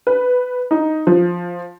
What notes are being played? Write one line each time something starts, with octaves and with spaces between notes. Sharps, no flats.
B4
D#4
F3